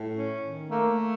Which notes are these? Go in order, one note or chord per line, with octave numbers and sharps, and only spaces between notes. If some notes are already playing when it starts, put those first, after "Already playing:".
Already playing: A2
C#4
D#3
A3 A#3